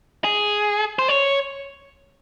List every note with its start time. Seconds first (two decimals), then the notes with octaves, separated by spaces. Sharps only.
0.24 G#4
0.99 C5
1.09 C#5